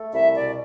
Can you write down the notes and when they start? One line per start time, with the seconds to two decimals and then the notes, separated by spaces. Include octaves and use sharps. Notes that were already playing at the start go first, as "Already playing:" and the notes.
Already playing: A3
0.12 C2 E5
0.35 B2 D5